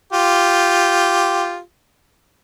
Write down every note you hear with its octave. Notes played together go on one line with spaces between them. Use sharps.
F4 G4